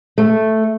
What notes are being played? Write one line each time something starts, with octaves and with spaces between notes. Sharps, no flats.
A3